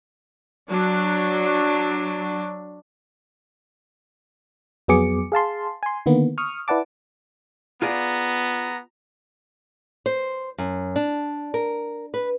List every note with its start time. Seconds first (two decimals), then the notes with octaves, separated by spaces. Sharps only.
0.68 F#3 D4
4.88 F2 F#3 B3 G#4 D6 C#7
5.32 G#4 F5 A5 C6
5.83 G#5 C6
6.06 D3 D#3 A#3 B3
6.38 C#6 D#6 F6
6.68 E4 B4 D5 F#5 A5 D6
7.82 B3 F4 G#4 D5 A#5
10.06 C5
10.58 F#2
10.96 D4
11.54 A#4
12.14 B4